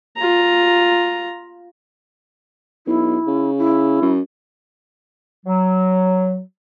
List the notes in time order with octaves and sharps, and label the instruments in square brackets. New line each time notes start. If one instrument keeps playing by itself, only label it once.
[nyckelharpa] F4 A#5
[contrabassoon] B1 [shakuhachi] E4
[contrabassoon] C#3
[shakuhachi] E4
[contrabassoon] F#2
[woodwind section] F#3